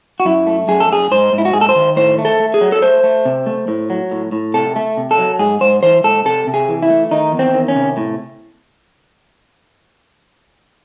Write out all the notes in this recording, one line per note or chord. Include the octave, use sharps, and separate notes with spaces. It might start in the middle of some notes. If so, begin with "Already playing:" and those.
F#4
F#2 E4
A3
F#2 G#4
A4
F#2 G#4
G#2 C5
G#2
E4
F#4
G#2 G#4
A4
C5
D#3
A2 C5
A3
A4
A3
G#4
F#3
A4
A3 C5
A3
C3
A3
A2
F#3
A2
A2
C3 A4
A3
C3
A4
F#3
G#2 G#4
G#2 C5
E3 C5
G#2 A4
C3 A4
C3
G#4
E3
E4
A3
D#3 D#4
E2
C4
D#3
C#4
C3
A2